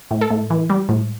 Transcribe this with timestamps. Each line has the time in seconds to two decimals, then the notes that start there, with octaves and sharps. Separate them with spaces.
0.11 A2
0.21 A4
0.31 A2
0.50 E3
0.70 G3
0.89 A2